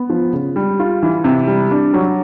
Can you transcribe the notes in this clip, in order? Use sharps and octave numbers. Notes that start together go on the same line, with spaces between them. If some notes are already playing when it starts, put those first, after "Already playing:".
Already playing: B3
F3
C#3
G3
F4
E3
C3
G3
D4
F#3